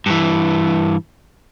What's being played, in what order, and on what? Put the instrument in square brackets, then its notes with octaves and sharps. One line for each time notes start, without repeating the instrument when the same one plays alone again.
[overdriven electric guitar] G2 E3